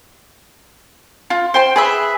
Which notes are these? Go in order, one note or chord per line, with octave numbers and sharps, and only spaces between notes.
F4
C5 G5 C6
G#4 B4 E5